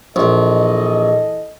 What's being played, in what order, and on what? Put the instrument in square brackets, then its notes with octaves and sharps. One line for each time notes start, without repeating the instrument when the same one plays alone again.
[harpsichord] A#1 [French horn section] E3 A4 D#5